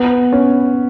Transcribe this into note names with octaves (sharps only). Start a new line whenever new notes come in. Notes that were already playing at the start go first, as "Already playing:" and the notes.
Already playing: B3
C#4